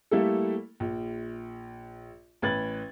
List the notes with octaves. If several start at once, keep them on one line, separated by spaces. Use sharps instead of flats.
G3 A3 A#3 E4 G4 A4
A#1
A1 B4 G#6 A6 F#7